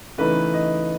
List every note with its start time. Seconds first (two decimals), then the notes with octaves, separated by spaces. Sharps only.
0.18 C#3 E3 A3 D#4 B4
0.54 D#5